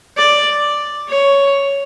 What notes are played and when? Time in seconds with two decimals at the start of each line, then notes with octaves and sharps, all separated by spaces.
0.17 D5
1.08 C#5